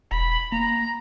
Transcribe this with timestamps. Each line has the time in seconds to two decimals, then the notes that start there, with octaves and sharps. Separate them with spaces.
0.12 E1 B5
0.52 A#3 A#5